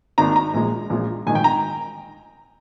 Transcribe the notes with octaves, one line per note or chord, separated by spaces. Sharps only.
G#1 G#2 D#3 A#3 D4 A#5
A#5
A#1 A#2 G#3
A#1 A#2 G#3
A#1 G#2 D#3 G#5
G5
A#5